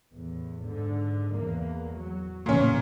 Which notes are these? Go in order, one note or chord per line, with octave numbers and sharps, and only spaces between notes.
E2 A2
G#2 D3
E2 A#3
F#3
A1 E2 A#2 C#3 C#4